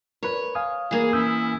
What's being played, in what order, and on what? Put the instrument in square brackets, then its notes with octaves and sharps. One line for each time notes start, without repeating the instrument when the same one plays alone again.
[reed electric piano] A#4 B4 [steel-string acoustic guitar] C#5
[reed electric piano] F5 G#5 D#6
[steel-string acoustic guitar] E3 A#3 [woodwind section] G#4
[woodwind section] C#4 E4 [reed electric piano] D#6 E6 G6